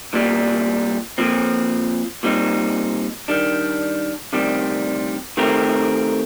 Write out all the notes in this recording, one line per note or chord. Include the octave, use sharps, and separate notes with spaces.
C2 A#2 G3
A#2 F3 C4
A#2 G3 C4 D#4
D#3 G3 D4
D2 C3 D#3 G3 C4
D#3 A3 C4 G4 A#4